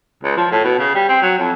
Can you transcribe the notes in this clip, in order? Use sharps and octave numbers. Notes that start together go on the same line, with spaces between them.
C#2
F3
A2
B2
C#3
G3
C4
F#3
F2